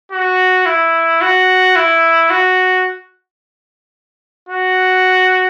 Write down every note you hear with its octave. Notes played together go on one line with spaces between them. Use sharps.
F#4
E4
F#4
E4
F#4
F#4